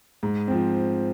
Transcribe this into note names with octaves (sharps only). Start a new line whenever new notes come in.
G#2
F3 C4